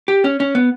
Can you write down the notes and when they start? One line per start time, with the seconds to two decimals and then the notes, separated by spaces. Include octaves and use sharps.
0.08 G4
0.24 C#4
0.40 C#4
0.55 B3